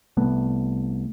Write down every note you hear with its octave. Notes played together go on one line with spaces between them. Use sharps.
C2 A3 B3